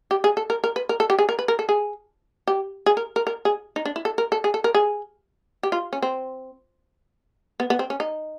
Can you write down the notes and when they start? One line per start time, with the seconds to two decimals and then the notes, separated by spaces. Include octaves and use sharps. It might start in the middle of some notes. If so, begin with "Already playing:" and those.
0.11 G4
0.24 G#4
0.37 A4
0.50 A#4
0.64 A#4
0.76 B4
0.89 A#4
1.00 A4
1.10 G4
1.19 G#4
1.29 A#4
1.39 B4
1.48 A#4
1.59 A4
1.69 G#4
2.48 G4
2.86 G#4
2.97 A#4
3.16 A#4
3.27 A#4
3.45 G#4
3.76 D#4
3.85 D4
3.96 E4
4.05 A4
4.18 A#4
4.32 A4
4.44 G#4
4.54 A4
4.64 A#4
4.75 G#4
5.63 G4
5.72 F4
5.93 C#4
6.02 C4
7.60 B3
7.70 B3
7.79 C4
7.90 C#4
8.00 D#4